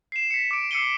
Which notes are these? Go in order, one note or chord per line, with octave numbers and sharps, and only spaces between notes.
C7 E7
B6 C#7
D6 D7
E6 C7 C#7 D#7 G7